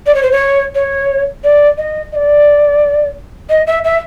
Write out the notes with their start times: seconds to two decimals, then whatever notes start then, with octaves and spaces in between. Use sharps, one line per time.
0.06 D5
0.15 C#5
0.23 C5
0.32 C#5
0.75 C#5
1.44 D5
1.78 D#5
2.12 D#5
2.15 D5
3.49 D#5
3.67 E5
3.84 E5